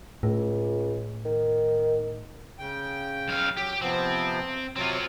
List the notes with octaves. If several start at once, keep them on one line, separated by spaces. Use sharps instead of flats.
C#2 A2
D#3
C#3 G5
B1 F5
F#3 G4
C3 F3 B3 C4
C3 F#3 C4 F4